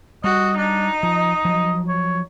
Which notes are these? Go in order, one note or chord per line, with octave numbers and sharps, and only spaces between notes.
G3 F#4 D#5
D4 D#4
F3 D#5
F3 F#3
C#5